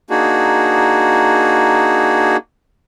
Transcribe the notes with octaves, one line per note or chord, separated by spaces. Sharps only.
A#3 D4 D#4 F#4 G#4